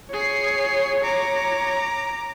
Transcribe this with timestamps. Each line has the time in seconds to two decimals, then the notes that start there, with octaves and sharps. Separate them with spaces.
0.13 G#4 C#5 C7
1.04 A#5 D6